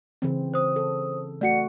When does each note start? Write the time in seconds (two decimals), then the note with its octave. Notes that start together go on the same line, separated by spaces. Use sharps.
0.22 C#3 E3 C4
0.54 C5 D#6
0.76 A4
1.41 A3 F#4 D5 F#5 C#7